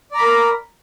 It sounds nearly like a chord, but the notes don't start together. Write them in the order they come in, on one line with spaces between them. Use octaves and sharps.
D5 A#5 B5 A#4